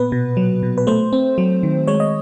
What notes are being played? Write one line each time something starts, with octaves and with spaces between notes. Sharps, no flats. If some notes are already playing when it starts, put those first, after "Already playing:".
Already playing: A#2 B3 B4
B2
F#3
B2
B4
A3 C5
C4
F#3
D#3
G#3 C#5
D#5